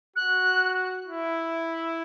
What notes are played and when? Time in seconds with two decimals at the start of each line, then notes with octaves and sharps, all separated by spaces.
0.16 F#4 F#6
1.06 E4